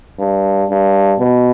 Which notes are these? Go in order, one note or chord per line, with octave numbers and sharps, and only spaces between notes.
G2
G2
B2